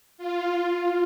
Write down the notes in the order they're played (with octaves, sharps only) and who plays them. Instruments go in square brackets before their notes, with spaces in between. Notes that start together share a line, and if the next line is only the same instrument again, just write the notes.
[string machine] F4